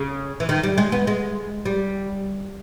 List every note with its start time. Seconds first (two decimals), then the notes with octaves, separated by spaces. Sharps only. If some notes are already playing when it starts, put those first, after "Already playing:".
Already playing: C#3
0.40 E3
0.49 D#3
0.63 G3
0.78 G#3
0.92 B3
1.07 G#3
1.65 G3